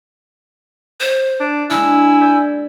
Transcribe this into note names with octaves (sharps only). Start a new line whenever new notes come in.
C5
D4
G#3 A#3 D4 E4 G#5 E6
D5 G6 B6